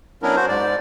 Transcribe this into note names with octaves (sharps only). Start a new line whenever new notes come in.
F#3 B3 C#4 D4 E4 A#4
F#4 C5
G#2 D5